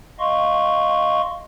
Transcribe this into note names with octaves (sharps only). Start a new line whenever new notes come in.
D#5 F5 C6 C#6